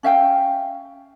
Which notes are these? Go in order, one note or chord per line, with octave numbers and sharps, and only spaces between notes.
C#4 E5 F5 G5